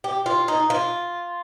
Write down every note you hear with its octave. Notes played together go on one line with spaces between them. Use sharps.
G4
F4
D#4
F4